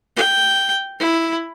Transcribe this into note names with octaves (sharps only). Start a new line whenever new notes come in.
G5
E4